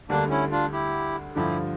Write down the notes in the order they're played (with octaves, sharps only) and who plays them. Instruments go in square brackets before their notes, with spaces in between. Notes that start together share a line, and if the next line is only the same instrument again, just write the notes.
[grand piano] D2 D3 G3 [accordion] A#3 D4
[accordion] C#4 E4
D4 F4
E4 G4
[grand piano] G2 D3 F3 [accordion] E4 G4